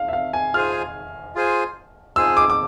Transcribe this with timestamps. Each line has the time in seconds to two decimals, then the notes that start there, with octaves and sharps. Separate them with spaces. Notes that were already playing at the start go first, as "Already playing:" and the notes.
Already playing: F5
0.08 E5
0.13 F5
0.33 G#5
0.54 F4 G#4 C5 G#5 F6
1.35 F4 G#4 C5 G#5
2.16 F4 G#4 C5 G#5 E6
2.37 D6
2.50 D6